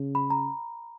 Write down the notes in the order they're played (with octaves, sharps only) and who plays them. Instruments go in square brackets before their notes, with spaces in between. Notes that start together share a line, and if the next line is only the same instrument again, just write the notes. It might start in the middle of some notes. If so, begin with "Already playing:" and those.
Already playing: [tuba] C#3
[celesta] B5
A#5